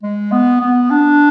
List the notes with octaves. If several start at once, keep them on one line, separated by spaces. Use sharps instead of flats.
G#3
B3
B3
D4